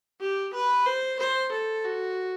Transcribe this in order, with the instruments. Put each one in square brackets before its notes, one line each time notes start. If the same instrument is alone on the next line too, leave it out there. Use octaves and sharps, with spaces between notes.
[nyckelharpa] G4
B4
C5
C5
A4
F#4